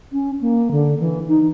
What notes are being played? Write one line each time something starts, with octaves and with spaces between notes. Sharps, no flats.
C#4
A#3
D3
E3
D#4